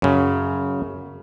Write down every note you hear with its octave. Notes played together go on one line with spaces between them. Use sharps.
F#2 C#3